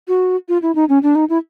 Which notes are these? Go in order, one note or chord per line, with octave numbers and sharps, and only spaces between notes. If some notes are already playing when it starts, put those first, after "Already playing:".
F#4
F4
E4
D#4
C#4
D4
D#4
E4